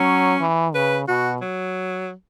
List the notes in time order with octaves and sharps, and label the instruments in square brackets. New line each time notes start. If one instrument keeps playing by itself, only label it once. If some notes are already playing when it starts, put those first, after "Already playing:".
Already playing: [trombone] F#3 [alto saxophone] C#4
[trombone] E3
[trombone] C#3 [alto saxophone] B4
[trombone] B2 [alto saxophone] F#4
[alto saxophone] F#3